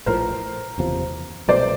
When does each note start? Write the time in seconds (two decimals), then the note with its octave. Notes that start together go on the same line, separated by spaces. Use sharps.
0.06 A#1 A2 F3 A#4 C5
0.78 F#1 E2 C3 F3
1.48 C2 B2 F#3 A3 C5 D5